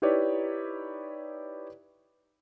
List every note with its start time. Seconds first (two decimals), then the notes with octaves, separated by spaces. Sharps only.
0.02 D#4 E4 G4 B4 C#5 D5